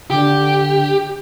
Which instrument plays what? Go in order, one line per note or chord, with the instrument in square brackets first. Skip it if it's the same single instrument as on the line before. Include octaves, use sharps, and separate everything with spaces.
[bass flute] D3 [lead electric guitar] G4